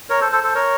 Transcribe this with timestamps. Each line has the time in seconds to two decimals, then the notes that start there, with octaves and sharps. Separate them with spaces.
0.10 A#4 C#5
0.21 A4 C5
0.32 A4 C5
0.43 A4 C5
0.55 A#4 C#5